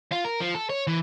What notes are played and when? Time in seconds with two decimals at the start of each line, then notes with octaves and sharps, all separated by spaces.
0.12 F4
0.24 A#4
0.40 F3
0.55 A4
0.70 C#5
0.87 E3